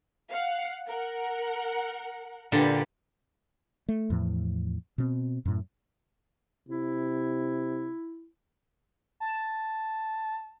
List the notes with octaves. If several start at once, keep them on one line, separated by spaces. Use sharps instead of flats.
F5 F#5
A#4 F#5
A#2 D3 G4 B4
A3
E2 A2 F3
B2 C4
F#2 A2
C3 E4
A5